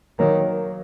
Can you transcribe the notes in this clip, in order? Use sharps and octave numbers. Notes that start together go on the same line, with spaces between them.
D#3 F#3 A#3